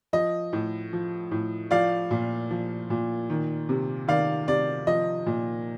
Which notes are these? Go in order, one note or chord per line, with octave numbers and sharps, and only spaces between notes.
F3 D#5
A2
F3
A2
F3 D5 F5
A#2
F3
A#2
D#3
C3
D#3 D5 F5
C3 D5
F3 D#5
A#2